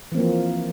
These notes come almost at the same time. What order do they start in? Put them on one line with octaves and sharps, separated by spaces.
E3 C4 A#3 F3